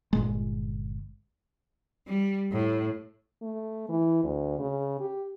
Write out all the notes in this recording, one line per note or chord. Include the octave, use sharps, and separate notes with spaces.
G1 A#2 G#3
G3
A2
A3
E3
D2
C#3
G4